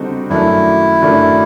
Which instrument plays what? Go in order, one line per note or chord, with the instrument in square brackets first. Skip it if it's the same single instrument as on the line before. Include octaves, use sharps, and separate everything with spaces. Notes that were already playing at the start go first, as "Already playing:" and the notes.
Already playing: [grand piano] D3 G3 C4 D#4 F#4
[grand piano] F#2 D#3 F#3 A3 D4 [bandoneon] E4
[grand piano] F#2 D#3 F#3 A3 D4